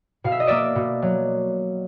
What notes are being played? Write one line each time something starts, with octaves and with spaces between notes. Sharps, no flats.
B2 F5
E5
D#5
A#3 D5 E5
B2
F#3